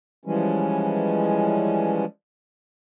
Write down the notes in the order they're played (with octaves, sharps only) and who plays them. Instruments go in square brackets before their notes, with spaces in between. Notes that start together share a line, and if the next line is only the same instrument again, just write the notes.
[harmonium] E3 F3 G3 G#3 C#4